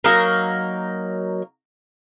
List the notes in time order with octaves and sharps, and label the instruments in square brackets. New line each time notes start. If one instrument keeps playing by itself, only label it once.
[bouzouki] F#3 A#3 D#4 A#4